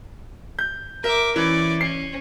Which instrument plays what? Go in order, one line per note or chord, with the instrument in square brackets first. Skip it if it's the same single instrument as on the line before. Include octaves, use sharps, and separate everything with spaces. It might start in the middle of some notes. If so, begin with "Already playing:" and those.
[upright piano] G6
[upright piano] A#4 [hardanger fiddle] E5 D6
[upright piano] E3 [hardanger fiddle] C#4 D5
[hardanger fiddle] C#4 [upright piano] C7